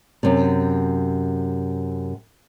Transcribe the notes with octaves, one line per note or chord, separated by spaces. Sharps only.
F#2 C3